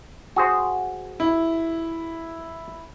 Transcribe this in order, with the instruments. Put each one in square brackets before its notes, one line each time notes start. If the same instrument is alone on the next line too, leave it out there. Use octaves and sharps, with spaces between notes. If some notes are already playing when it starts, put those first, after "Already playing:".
[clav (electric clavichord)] F#4 G#4 C5
[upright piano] E4